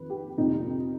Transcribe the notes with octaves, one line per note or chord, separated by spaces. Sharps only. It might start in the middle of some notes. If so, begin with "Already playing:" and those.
Already playing: F2 D#3 B4
G4
F2 C3 F3 D#4